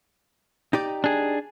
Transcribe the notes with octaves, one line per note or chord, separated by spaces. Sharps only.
D#4 G4 D5
D4 G#4